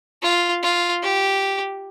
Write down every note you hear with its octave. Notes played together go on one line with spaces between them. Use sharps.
F4
F4
G4